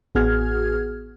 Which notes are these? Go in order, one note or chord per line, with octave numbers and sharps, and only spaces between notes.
A1 B3 F#4 G#4 F6 G#6